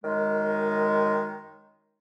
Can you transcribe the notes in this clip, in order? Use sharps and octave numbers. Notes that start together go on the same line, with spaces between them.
F#2 D#3 G#3